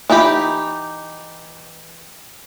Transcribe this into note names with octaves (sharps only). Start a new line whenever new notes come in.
E3 D#4 F4 G4 B5